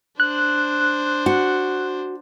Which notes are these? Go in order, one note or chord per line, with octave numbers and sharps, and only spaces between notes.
D4 C5 F#6
F#4